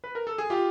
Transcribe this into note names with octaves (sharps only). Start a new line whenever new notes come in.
B4
A#4
A4
G#4
F4 G4